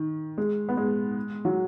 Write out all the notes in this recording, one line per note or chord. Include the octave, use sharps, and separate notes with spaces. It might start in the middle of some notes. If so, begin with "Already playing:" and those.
Already playing: D#3
G#3
B3
G#3
F#3